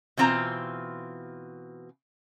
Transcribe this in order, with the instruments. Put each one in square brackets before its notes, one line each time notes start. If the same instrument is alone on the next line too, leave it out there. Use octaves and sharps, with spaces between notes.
[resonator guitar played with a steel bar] B2 E3 C4 F4 A#5